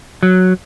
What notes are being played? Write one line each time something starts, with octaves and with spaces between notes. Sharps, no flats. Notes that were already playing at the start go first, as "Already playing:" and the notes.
F#3